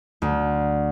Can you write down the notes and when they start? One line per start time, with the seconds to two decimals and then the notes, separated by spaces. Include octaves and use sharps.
0.22 D2